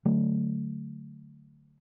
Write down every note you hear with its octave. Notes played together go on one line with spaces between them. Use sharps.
D3 F#3 A3